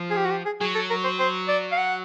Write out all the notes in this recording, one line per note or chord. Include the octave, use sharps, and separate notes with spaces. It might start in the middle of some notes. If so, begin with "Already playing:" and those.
Already playing: F3
G#4
G4
F#4
G4
G#4
F#3 G#4
A4
A#4
C5
C5
D5
F5
F#5